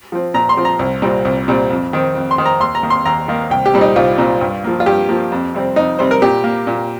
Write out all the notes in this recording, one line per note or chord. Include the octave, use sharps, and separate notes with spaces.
F3 C4
A#2 A#5
C6
F3 C4
A#5
C2
A#2 G3 C4
C2
A#2 G3 C4
F2
D#3 C4
F2
C6
D#3 C4
A#5
D#2 C6
A#5
D#3 A#3
C6
D#2 A#5
D#3 A#3
C2 G5
G4
A#2 G3 C4
D#4
C2 F4
A#2 G3 C4
G2
F3 A#3
F4
G2 G4
F3 A#3
F2
C3 G3 C4
F2 D#4
C3 G3 C4 C5
A#4
A#2 G4
A#3
A#2